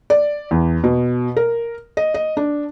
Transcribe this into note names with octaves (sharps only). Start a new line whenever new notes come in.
D5
E2
B2
A#4
D#5
D#5
D4